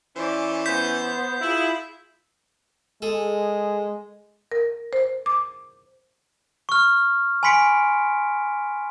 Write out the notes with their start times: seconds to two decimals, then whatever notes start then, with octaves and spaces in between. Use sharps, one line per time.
0.16 E3 C#4 C5 D5
0.66 B3 C5 G6 B6
1.41 E4 F4 G#4
3.02 G#3 G#4 A4
4.52 A#4
4.93 C5
5.26 D6
6.69 C#6 F6
7.43 G#5 B5 C6 B6 C#7 D7